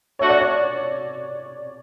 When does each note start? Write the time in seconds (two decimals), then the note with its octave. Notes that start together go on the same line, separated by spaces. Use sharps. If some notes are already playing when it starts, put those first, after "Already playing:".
0.19 A3 D4 F#4 C#5
0.30 D5
0.40 C#5